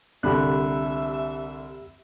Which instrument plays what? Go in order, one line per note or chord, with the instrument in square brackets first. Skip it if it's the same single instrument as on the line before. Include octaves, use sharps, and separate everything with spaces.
[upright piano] C2 D3 [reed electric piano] G4 B5 F#6 [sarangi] E5